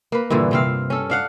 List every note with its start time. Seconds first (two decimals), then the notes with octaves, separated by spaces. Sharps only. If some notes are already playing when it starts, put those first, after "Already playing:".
0.12 A#3 B4
0.30 G2 A#2 D3 E3
0.51 C3 C4 F5
0.90 C#4 A4
1.10 D4 F5 F#5